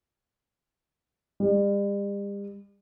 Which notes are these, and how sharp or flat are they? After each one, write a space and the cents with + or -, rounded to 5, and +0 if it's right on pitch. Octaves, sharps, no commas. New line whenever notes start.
G3 +40